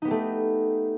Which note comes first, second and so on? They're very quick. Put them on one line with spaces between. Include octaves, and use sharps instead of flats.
D#4 B3 G4 A3